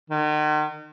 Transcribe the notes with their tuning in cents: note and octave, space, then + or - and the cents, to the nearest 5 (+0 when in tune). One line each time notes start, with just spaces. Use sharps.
D#3 -40